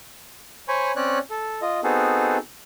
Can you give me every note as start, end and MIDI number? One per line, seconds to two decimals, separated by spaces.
0.68 0.92 72
0.68 0.92 73
0.68 0.92 80
0.68 0.92 83
0.68 0.92 85
0.96 1.19 60
0.96 1.19 61
0.96 1.19 73
0.96 1.19 74
0.96 1.19 90
1.30 1.60 69
1.62 1.80 65
1.62 1.80 75
1.84 2.37 59
1.84 2.37 60
1.84 2.37 63
1.84 2.37 66
1.84 2.37 68
1.84 2.37 69